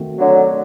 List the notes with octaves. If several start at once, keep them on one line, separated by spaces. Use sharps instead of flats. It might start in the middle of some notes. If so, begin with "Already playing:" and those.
Already playing: D#3 A3 C4 F#4
D3 F#3